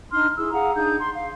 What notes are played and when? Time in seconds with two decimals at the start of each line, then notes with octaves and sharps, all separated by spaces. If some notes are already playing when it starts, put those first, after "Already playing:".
0.12 D4 D#4 C6 F6
0.37 E4 G#4 E6
0.53 G#4 F5 F#5 A#5
0.76 D4 D#4 G#4 G6
1.00 C6
1.14 F5